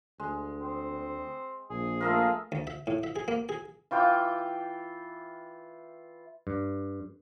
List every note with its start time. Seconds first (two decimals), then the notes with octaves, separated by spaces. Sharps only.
0.20 D2 G#3
0.61 C4
1.70 A#1 G#4
2.01 A3 A#3 F4 A#4 D#5 E5
2.52 D2
2.67 E5
2.87 A2
3.03 E5
3.16 G#4
3.28 A#3
3.49 G#4
3.91 E3 F4 G5 D6
6.47 G2